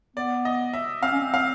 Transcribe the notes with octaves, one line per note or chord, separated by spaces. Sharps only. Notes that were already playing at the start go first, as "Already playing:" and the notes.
B3 D5
D#5
E5
C4 F5
C#4
C4
F5